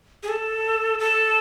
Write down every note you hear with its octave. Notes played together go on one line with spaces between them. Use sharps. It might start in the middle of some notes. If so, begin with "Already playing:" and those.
G#4
A4
A4